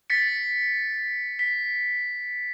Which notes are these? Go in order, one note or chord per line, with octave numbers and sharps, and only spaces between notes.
A6 B6 C#7
B6